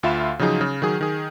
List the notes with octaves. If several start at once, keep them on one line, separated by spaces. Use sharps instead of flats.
D2 F4 E5 F5 B5 E7
C#3 F3 F#3 D#4 G#4 D#6
C#3
D#3 F#3 G#4
D#3 G#4